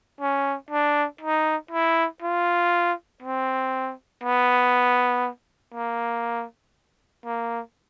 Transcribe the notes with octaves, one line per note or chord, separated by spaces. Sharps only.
C#4
D4
D#4
E4
F4
C4
B3
A#3
A#3